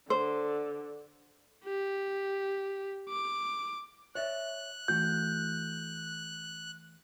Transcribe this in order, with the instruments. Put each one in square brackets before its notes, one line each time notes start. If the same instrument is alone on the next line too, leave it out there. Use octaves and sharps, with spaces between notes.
[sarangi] D3 [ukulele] C5
[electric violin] G4
D6
[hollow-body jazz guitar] C#5 D5 E5 [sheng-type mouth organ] F#6
[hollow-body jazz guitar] E3 A3 F#4 [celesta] G6